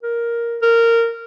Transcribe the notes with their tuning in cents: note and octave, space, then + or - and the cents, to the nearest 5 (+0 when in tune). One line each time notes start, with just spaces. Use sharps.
A#4 +5
A#4 -15